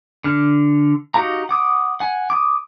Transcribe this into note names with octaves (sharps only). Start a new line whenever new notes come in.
D3 F6
D#4 F#4 G4 F5 A#5
F#5 D6 D#6
F#5 G#5
D6 D#6